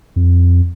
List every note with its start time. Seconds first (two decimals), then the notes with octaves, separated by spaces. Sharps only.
0.16 F2